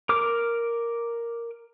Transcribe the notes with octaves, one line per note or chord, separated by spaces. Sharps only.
A#4 D6 F6